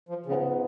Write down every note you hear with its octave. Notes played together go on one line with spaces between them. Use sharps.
F3
G#2 C#3 F3 B3